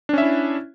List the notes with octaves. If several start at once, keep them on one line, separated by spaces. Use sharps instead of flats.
C#4 D4 E4 E5